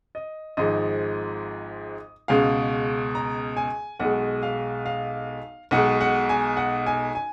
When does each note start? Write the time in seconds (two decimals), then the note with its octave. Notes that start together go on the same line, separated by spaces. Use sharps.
0.15 D#5
0.57 G#1 G#2 F3 G#3 D#5
2.28 C#2 B2 G#3 F5
3.15 A#5
3.57 G#5
3.99 B1 B2 G#3 F#5
4.43 F5
4.86 F5
5.71 B1 B2 G#3 F#5
6.01 F#5
6.29 G#5
6.57 F#5
6.86 G#5
7.15 G#5